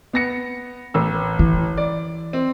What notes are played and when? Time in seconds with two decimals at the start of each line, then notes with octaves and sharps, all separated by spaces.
0.13 B3 A#6 C#7
0.94 A1 E6
1.39 E3
1.77 D5
2.33 C4